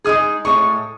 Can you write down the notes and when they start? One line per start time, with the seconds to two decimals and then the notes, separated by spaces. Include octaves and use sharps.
0.04 G#3 D#4 G#4 D#6
0.45 A2 G#3 D#4 A4 C#5 C#6